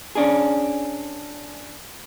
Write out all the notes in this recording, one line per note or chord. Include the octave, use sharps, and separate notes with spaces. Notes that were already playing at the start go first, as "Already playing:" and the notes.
C#4 D4 G#4